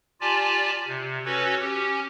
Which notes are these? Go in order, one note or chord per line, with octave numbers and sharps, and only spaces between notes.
F4 G4 D5 G#5 A5
C3
C#4 F#4 A4 B4 C#5
C#4 G4